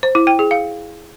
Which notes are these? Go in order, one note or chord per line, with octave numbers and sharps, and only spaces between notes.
C5
E4
G5
G#4
F5